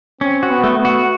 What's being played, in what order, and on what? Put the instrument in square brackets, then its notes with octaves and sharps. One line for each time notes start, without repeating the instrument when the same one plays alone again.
[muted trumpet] C4 [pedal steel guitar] C#4
[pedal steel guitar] F#4
[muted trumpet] B3
[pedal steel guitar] A3
[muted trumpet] B3
[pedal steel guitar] F#4